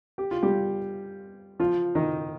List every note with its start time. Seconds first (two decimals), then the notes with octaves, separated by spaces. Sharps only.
0.18 G4
0.31 F4
0.42 G3 G4
1.60 F3 F4
1.95 D#3 D#4